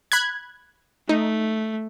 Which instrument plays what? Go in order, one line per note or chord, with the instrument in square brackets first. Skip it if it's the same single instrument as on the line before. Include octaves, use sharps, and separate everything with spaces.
[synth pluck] B5 F#6 G#6
[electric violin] A3 [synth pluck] D#4